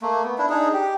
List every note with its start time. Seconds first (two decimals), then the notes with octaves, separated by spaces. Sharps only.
0.02 A3 A#3
0.24 B3
0.38 D4 E4
0.50 D4 D#4 G#4
0.73 G4